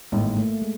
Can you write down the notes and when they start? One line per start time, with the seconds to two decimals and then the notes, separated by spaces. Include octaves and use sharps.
0.12 A1 G#2 D#3 A#3
0.37 A3
0.62 G#3